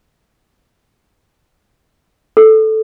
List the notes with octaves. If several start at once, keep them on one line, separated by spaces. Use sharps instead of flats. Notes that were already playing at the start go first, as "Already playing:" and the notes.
A4